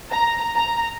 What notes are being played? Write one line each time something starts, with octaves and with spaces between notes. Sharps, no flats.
A#5
A#5